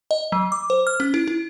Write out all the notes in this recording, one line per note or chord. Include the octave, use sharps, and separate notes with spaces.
D#5
F#3
D6
C5
F6
C#4
E4
E4